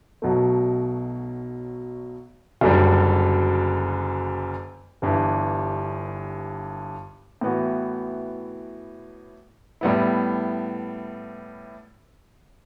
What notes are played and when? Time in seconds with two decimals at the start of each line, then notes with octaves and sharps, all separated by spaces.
0.22 B1 B2 F#3 A3
2.61 F#1 F#2 D3 G3
5.02 G1 G2 E3
7.41 A2 E3 B3 F#4
9.81 A2 G3 B3 E4